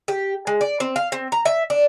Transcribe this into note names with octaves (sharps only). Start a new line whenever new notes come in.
G4
G#3
D5
C4
F5
C4
A#5
E5
D4